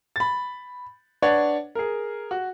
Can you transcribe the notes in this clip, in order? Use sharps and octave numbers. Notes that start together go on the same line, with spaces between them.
B5 A6
D4 B4 C#5 D5 F#5
G#4 A#4
F#4